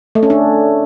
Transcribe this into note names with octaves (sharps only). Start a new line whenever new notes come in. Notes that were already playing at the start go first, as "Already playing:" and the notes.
A3
C#4
D4